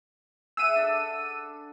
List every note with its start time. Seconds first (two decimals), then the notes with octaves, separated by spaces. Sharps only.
0.57 G#4 E5 F#5 E6 D#7
0.76 D4 A4